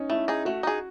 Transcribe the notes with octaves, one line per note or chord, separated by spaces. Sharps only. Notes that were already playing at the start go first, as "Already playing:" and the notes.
Already playing: C#4 D#4
A3 E4
D#4 G#4
A3 F#4
D#4 G#4